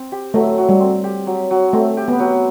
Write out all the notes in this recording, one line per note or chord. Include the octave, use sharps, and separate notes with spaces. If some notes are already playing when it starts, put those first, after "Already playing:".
Already playing: C4
G4
F#3 A3
F#3
G3
C4
G4
F#3
F#3
A3 C4
G4
B3
F#3